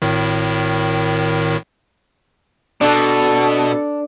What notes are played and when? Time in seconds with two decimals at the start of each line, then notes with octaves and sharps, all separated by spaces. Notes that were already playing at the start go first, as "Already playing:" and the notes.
0.02 G#1 A2 D#3
2.81 B2 D4 A4